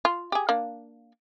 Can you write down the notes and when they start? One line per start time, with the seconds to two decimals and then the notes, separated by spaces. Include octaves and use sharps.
0.05 F4
0.32 G4 G#4
0.49 A#3 D4